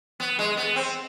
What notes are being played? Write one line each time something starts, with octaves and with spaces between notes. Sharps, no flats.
B3
G#3
B3
C4